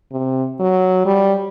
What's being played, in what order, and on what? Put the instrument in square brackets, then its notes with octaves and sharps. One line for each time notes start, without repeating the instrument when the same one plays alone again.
[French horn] C3
F#3
G3